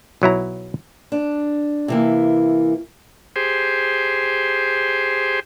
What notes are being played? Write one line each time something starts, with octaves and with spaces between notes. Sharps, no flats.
B1 F#3 E4 A#5
D4
C3 E3 A#3
G4 G#4 C5